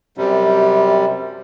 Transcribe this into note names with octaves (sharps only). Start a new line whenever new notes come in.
F#2 C3 G3